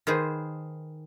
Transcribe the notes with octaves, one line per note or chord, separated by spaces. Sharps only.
D#3 G#4 B4 C5